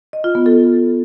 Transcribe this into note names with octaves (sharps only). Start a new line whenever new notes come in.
D#5
F4
B3
A4